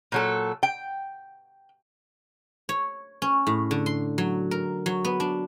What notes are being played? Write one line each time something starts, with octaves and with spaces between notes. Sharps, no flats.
A#2 F#3 A4
G5
C#5
C#4
A2
D3
C6
F#3
A#4
F#3
B3
D4